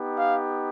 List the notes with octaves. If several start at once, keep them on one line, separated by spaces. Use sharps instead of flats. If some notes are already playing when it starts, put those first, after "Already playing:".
Already playing: B3 D#4 G4
F5